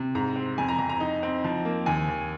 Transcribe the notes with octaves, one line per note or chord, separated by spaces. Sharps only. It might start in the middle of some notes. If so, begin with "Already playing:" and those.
Already playing: C3
G#2 A#5
C4
F2 G#5
A#5
F2 A#5
A#5
D#4
C4
F3
A#3
D#2 G#5
D#2